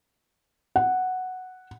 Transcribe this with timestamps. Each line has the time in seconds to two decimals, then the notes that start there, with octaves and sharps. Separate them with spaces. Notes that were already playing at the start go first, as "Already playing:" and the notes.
0.76 F#5